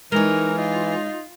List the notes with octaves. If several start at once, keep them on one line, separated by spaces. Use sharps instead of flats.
E3 G#3 D#4 A#4 C#5
D#4 F4